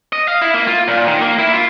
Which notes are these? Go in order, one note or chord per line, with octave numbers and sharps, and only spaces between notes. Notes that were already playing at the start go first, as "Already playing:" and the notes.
D#5
F5
E4
A#3
F4
A#2
D#3
A#3
E4
F4